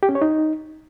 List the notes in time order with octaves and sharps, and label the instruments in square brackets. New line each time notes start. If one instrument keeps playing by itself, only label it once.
[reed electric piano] G4
C#4
C#5
D#4